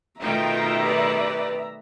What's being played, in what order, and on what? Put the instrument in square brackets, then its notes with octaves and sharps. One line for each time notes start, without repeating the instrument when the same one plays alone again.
[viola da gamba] B2 D#3 A3 [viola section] D#4 F4 G5 [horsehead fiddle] E5 A#5
[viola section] G4 B4 D5